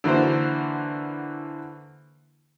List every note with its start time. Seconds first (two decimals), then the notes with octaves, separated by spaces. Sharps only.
0.04 D3 E3 A#3 F#4 C5